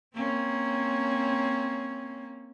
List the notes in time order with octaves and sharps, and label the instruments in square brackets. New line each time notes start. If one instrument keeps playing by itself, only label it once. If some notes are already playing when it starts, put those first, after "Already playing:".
[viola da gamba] A#3 C4 C#4